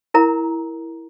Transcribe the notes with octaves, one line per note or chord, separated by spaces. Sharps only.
E4 A#4 A#5